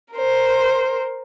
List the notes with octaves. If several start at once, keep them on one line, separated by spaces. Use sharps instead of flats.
A#4 C5